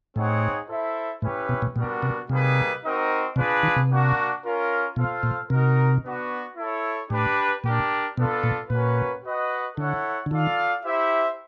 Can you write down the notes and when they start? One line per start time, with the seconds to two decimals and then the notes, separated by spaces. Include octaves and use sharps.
0.15 A2 C4 D#4 G#4 C#5 F#5
0.69 E4 A4 C5 E5
1.22 A2 C#4 E4 G4 B4
1.49 B2
1.62 A#2
1.76 A#2 G3 B3 D4 F#4 A#4
2.03 C3
2.29 C3 G3 A#3 D#4 G#4 B4
2.83 C4 D#4 F#4 A#4 D#5
3.36 C3 D4 F4 G#4 B4
3.63 D#3
3.76 C3
3.89 A#3 D4 F#4
4.44 C#4 F4 A#4
4.96 B2 F4 A4 C5 F5
5.23 A#2
5.50 C3 D#4 F#4 A#4
6.04 B3 D4 F#4
6.57 E4 A4 C#5
7.10 A2 D4 G4 B4
7.64 A#2 D4 G4 A#4
8.17 B2 B3 D4 F4 A4
8.43 A#2
8.70 A#2 A#3 C#4 F#4 B4
9.24 F#4 B4 D#5 F#5
9.77 D3 E4 A4 C#5 F#5
10.26 D3
10.31 D#3 F4 A4 D5 F5
10.85 E4 G4 C5 E5